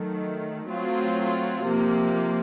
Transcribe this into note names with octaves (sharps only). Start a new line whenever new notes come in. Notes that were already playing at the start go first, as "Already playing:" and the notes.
Already playing: D#3 F#3 A3
F#3 A3 C4 F4
C3 F3 A#3